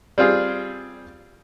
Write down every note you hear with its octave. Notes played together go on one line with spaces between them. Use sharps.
G3 C4 F4 G#4